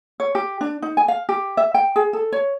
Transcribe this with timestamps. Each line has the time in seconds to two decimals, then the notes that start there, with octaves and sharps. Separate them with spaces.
0.20 C#5
0.35 G4
0.61 D4
0.82 D#4
0.97 G#5
1.08 F5
1.29 G4
1.57 E5
1.74 G5
1.96 G#4
2.13 A4
2.32 C#5